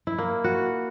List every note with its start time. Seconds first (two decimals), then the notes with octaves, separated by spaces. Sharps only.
0.07 E4
0.18 A#3
0.44 F#4